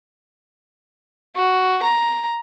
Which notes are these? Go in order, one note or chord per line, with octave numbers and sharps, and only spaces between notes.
F#4
A#5